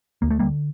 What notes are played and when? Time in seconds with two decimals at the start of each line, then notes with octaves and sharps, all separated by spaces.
0.22 D2 A#3
0.30 A3
0.39 D3 G3 A#3